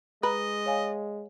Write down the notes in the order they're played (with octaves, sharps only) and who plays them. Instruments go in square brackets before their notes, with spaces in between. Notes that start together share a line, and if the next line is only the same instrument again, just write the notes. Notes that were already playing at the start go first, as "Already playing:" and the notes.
[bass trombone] G#3 [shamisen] B4 [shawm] D#5 [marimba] A#5
[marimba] C#5 F5 G#5